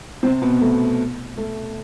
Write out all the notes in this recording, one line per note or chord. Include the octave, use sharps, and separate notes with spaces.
C3 C4
B2 B3
A3
A3